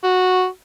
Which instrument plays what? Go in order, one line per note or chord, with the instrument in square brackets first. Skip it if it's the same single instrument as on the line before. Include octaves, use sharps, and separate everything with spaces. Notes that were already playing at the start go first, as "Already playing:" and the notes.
[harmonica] F#4